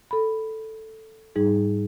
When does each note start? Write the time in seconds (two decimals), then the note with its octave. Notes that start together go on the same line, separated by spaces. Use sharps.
0.11 A4 B5
1.36 G#2 G3 D#4 G#4